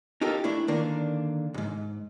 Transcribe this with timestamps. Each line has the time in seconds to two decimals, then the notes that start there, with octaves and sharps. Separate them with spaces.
0.21 D#4 F4 G4 A4 A#4
0.44 A3 D4 E4
0.68 D3 D#3 A#3 D4
1.54 D2 G#2